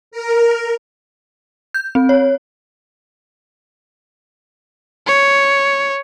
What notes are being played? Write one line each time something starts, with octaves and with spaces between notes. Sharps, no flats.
A#4
G6
C4
C#5
C#5